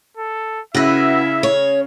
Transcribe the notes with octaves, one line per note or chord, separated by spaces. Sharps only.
A4
C#3 E4 F#4 B4 E5 A#6
C#5